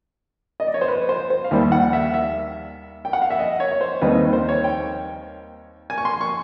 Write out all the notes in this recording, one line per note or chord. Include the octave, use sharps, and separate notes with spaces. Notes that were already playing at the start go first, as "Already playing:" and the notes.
D#5
D5
C#5
C5
B4
C5
C5
F5
D#2 D#3 G3 E5
F#5
E5
E5
G5
F#5
F5
E5
D#5
C#5
C#5
C5
D#2 D#3 G3 C4 D#4 B4
B4
C5
C#5
G5
G#5
C#6
C6
C#6